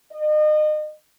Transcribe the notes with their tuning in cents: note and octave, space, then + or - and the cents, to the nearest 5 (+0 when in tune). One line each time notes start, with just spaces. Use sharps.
D#5 -35